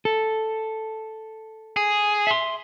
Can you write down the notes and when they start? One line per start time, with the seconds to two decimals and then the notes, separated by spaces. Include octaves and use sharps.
0.05 A4
1.77 G#4
2.27 E5 C6